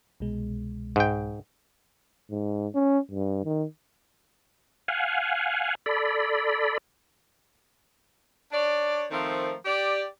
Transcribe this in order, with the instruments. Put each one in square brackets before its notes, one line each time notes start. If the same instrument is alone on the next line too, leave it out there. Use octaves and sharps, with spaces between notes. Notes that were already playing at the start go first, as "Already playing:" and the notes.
[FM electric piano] C2 B2 G#3
[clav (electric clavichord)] G#2 G5
[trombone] G#2
C#4
G2
D#3
[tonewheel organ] F5 F#5 G#5
A4 D5 B5
[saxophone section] D4 C#5 D5
D#3 F3 A3 C4 A#4
G4 D5